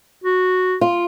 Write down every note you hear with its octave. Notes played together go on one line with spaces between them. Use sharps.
F#4
F4